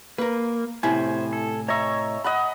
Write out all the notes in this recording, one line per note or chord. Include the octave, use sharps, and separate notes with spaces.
A#3 A#4 B4
A2 C3 E4 C5 G#5
A4
C#5 D#5 E5 A#5 C#6
D#5 F#5 B5